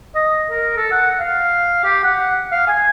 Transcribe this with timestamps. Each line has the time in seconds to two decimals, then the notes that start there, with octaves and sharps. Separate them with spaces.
0.15 D#5
0.50 A#4
0.77 A4
0.92 F#5
1.20 F5
1.84 G4
2.03 F#5
2.52 F5
2.67 G#5